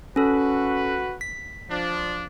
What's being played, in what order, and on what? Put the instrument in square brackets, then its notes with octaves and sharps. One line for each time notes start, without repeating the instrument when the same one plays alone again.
[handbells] C#4 A4 [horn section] F#4 B4
[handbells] B6
[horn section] F3 D4